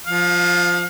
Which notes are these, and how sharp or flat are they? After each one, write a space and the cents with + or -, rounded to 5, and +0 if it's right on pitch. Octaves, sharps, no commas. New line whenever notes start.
F3 +0 F5 +30